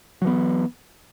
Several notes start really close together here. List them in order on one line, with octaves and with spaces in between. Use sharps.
F#3 E3 B3